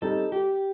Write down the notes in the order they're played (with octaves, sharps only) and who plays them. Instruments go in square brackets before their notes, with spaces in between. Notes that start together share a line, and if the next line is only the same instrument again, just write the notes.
[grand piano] G3 C4 D#4 [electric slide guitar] A4
[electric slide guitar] G4